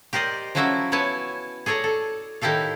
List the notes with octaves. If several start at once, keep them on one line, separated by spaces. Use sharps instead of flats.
G4 A#4 C5 D5 D#5
F3 F#3 C#4 E4 F#4 E5
B3 E4 C#5 G#5 A5
G#4 A4 C#5 D5 A#5
A4
A2 D#3 E4 G4 A4 F5